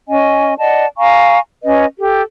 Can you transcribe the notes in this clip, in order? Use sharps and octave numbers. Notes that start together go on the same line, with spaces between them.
C#4 D#5 G#5
D5 D#5 F#5 A5
F5 G#5 A#5 C#6
C#4 B4 D#5
G4 A4